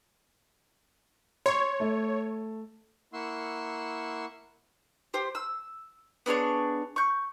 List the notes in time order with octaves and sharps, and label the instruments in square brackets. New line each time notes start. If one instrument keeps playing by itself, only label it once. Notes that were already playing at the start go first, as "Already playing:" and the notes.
[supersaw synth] C#5 [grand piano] C6 C#6
[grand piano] A3
[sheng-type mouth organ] A#3 E4 F#5 C6 C#6 E6
[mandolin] G4 C5
E6
B3 D4 G#4 C#5
C#6 G6